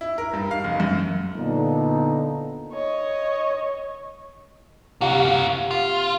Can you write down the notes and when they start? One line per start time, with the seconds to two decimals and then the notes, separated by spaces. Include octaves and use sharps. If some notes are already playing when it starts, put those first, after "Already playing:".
0.01 E4
0.18 A#4
0.33 G2
0.51 F5
0.64 F1
0.80 F#2
1.35 A#2 D3 A#3 B3 D#4 A4
2.73 C#5 D#5
5.01 C3 A#3 F#4 F5
5.71 F4